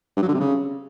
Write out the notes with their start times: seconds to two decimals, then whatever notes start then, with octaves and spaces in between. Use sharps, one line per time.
0.16 G2
0.22 F#3
0.28 D3
0.34 C3
0.40 C#3